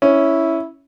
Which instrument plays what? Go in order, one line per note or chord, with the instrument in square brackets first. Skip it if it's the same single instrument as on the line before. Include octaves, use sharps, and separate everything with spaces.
[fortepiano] C#4 [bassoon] E4